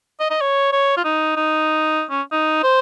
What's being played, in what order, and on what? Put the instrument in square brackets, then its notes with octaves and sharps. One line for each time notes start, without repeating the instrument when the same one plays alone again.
[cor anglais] D#5
D#5
C#5
C#5
F4
D#4
D#4
C#4
D#4
C5